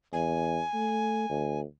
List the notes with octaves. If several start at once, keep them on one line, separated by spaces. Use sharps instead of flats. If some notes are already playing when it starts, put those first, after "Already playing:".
E2 G#5
A3
D2